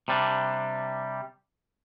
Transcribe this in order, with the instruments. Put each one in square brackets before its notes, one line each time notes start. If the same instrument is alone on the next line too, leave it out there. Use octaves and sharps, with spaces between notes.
[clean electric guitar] C3 G3 D4